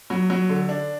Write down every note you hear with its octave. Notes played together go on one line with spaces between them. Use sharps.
F#3
F#3
D3
D4